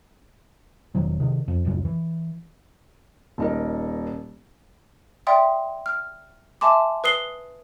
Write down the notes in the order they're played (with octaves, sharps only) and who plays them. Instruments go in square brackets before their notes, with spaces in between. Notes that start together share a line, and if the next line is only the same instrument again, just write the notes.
[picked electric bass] E1 D#3 F#3
C3 D#3
F2
D#1 C#2 F#2
E3
[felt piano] D#1 D#4 A#4
[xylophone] D5 E5 F#5 G5 C6 D#6
F6
E5 G#5 A5 C6 D6
B4 D#6 C7 G7